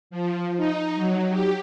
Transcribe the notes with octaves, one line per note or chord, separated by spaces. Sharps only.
F3
D#4
F#3
G4